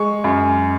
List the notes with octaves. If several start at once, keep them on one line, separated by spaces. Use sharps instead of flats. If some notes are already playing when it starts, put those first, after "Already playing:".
Already playing: G#3 C#6
F#2